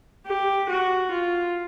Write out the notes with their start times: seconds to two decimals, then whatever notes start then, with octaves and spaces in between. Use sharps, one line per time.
0.26 G4
0.69 F#4
1.12 F4